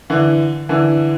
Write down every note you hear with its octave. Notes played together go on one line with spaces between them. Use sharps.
D3 E3
D3 E3